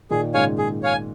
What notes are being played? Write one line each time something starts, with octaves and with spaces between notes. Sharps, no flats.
A#2 D#3 G#4
G#2 C#3 C#5 F5 G#5
G#4
C#5 F5 G#5